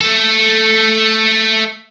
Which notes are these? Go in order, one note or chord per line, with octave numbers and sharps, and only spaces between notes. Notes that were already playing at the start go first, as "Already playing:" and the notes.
A3 A4